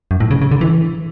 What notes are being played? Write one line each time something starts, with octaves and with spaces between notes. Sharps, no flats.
F#2
A2
C#3
C#3
D3
E3